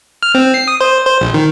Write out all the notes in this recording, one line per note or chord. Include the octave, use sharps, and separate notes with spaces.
F6
C4
C7
D#6
C5
C5
A#1
D#3